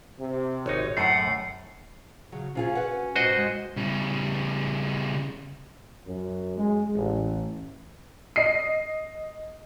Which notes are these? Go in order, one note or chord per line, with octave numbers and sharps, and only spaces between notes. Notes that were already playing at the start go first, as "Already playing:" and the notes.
C3
G#1 D#4 C#5
F#2 A2 A3 F#5 C7
C#3 F#3
C3 C#4 F4 G#4
F#4 B4 F#5
G#2 C3 F#4 C5 D#5
G#3
C#3 G3
F#2
G#3
A1
D#5 C7